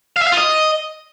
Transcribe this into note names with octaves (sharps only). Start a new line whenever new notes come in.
F5
E5
F5
F4
D#5